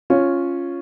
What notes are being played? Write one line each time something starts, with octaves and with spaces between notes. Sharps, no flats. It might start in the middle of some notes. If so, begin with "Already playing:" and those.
C#4 F4